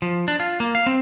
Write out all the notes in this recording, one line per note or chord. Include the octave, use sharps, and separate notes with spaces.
F3
D4
F4
A#3
F5
C4